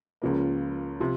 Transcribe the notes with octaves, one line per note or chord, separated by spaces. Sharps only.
C#2 C#3 F3 A#3
C3 F3